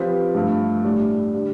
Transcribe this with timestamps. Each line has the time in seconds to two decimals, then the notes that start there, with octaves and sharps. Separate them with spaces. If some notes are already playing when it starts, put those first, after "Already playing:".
Already playing: F3 C4 G4 B4
0.35 G2 F3 A3
0.84 A2 G3 D4
1.34 D3 G3